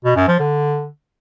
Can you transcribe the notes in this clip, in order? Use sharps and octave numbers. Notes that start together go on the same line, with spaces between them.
B2
F#2
F3
D3